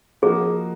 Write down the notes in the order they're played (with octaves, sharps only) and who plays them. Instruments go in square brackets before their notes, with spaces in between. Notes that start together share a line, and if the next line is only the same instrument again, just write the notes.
[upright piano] F3 A#3 D#4 F#4 [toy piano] G#4